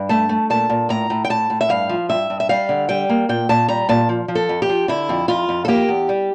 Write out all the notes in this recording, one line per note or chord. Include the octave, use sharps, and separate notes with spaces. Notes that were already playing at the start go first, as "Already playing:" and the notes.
Already playing: G2
A3 A5
A3
A#2 A5
A#2
A2 A#5
A2
G5
A2 A5
A2
E5
G2 F5
F3
G2 E5
G2
E5
G3 F5
D3
G3 G5
A#3
A#2 G5
A#2 A5
G3 A#5
A#2 A5
F3
F3
A4
F2
G4
F3
D3 E4
F2
F2 F4
F2
A4
A#3 G4
E2
G3